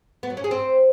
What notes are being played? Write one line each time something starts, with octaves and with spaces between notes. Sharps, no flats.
B3
F#3
C#4
G#4
C4